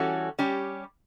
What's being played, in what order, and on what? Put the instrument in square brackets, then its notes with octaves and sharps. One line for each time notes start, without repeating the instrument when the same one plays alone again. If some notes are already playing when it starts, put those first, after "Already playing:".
Already playing: [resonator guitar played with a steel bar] E3 G3 C#4 F#4 A4
G3 C#4 G4